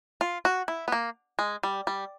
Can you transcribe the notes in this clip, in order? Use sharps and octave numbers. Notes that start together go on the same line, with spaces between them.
F4
F#4
E4
B3
A#3
G#3
G3
G3